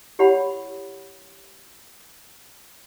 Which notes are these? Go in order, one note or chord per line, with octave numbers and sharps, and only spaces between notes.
E4 G4 C#5 F#5 B5